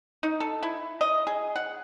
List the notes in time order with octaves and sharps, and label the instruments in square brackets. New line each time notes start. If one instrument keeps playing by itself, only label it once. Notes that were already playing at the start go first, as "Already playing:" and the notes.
[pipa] D#4
A4
E4
D#5
G#4
F#5